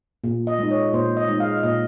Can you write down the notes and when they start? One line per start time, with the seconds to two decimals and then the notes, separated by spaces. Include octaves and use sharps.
0.24 A#2
0.47 D#5
0.59 G#3 D#4
0.71 C#5
0.93 A#2 C5
1.17 D#5
1.29 G#3 D#4
1.40 F5
1.63 A#2 D#5